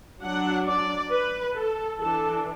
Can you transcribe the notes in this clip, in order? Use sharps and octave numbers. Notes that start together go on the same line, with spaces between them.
F#3 D4 F#5
D5
B4
A4
E3 D4 A4